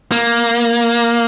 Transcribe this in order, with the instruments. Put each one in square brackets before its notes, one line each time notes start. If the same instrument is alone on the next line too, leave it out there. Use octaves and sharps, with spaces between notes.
[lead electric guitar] A#3